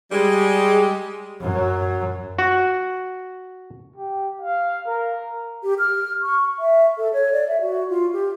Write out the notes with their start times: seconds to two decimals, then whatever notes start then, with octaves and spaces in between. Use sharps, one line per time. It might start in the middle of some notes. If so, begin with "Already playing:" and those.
0.12 G3 G#3
1.41 F#2 F#3
2.39 F#4
3.96 G4
4.42 F5
4.87 A#4
5.63 G4
5.79 F6
6.22 C#6
6.59 E5
6.98 A4
7.13 C#5
7.32 D5
7.48 E5
7.61 F#4
7.90 F4
8.13 G4